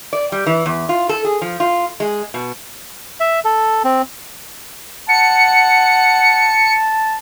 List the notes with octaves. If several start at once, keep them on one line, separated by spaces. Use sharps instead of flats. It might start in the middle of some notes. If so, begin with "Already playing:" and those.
D5
G3
E3
E2
F4
A4
G#4
F3
F4
G#3
B2
E5
A4
C4
F#5 A5 C#7